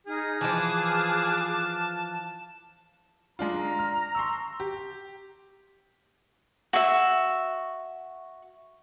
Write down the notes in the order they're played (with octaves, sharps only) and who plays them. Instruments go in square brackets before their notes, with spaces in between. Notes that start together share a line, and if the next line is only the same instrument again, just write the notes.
[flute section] D#4 F6 [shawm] G#4
[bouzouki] E3 F3 [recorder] A5 [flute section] D6 F6 F#6
[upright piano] G#3 D4 F4 [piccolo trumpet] A#5
[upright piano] F6
C6 C#6 E6
G4
[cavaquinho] F#4 E5